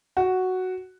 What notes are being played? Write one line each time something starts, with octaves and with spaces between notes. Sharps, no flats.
F#4